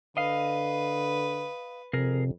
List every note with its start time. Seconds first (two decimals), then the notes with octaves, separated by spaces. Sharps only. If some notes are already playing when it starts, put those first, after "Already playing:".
0.17 D3 B4 D#5 F5
1.93 F2 C3 G#4 A#4